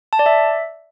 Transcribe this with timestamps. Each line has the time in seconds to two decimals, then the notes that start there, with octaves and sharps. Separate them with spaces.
0.13 A5
0.19 D5
0.26 E5